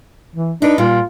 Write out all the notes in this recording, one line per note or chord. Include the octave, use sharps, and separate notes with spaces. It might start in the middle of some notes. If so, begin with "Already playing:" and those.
E3
D4 D#4 B4
A#2 G3 F4